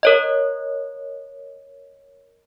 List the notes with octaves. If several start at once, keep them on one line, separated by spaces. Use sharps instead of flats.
A#4 C#5 D#5